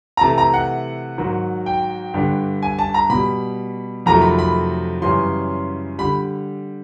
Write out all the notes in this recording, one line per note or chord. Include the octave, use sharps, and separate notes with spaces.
A#5
C3 E3 A3 A5
A#5
F#5
G#2 D#3 F#3
G5
G2 D3 G3
G#5
A5
A#5
B2 G3 B5
F2 C3 D#3 F#3 A3 A#5
B5
B5
F#2 C#3 E3 G3 C6
D3 G3 B5